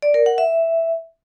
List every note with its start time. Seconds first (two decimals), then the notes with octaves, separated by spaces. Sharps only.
0.02 D5
0.14 A#4
0.26 F#5
0.38 E5